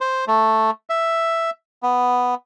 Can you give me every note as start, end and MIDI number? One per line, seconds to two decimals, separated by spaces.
0.01 0.25 72
0.27 0.70 57
0.90 1.50 76
1.83 2.35 59